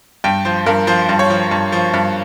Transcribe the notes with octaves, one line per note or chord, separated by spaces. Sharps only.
G2 G5
F3 C5
G2 A#4
F3 C5
G2
C#5
F3
G2
F3
G2